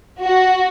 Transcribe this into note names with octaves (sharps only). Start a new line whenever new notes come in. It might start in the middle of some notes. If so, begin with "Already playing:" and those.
F#4